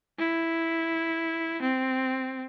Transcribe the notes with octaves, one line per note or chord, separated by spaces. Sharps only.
E4
C4